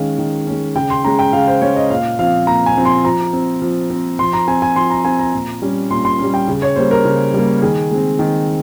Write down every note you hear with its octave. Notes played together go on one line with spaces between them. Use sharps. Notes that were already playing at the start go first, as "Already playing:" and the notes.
Already playing: D#3 G#3 C#4 F5
D#3
G#3 C#4
C#3 G5
C6
G#3 C#4 A#5
G5
C#3 F5
C5
G#3 C#4 C#5
D#5
A#2 F5
F3 C4 F5
A#2 A#5
G#5
F3 C4
C6
F3 A#5
C4
F3
C4
F3 C6
A#5
C4 G#5
G#5
F3 C6
A#5
C4 G#5
A#5
A#2
G3 C#4
A#2 C6
C6
G3 C#4
G5
C#3
C#5
G3 A#3 C5
A#4
C#3
G3 A#3
D#3 G#4
G#3 C4
D#3